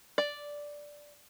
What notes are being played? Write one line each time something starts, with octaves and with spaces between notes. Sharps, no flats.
D5